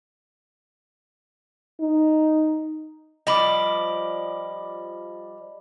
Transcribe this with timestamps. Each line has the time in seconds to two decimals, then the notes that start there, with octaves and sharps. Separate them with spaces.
1.81 D#4
3.27 F3 G3 D#5 B5 D6